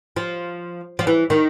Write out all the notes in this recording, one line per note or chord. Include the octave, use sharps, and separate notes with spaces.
F3
F3
E3
D#3